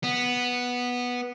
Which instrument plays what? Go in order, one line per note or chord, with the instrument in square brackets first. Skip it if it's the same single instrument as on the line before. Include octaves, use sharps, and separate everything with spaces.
[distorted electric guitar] B3